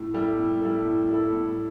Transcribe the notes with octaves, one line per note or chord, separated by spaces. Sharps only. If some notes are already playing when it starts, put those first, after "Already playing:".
Already playing: A2
G3 E4 A4
A2
G3 E4 A4
A2
G3 E4 A4
A2